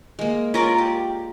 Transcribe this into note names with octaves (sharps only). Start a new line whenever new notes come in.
G#3 A#3
C#4 F4 A#4 D5
G4